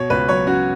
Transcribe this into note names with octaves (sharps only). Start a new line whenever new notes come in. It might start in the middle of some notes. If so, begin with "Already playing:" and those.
Already playing: B2 C#5
C#2 B4
F#3 C#5
C#4 F#4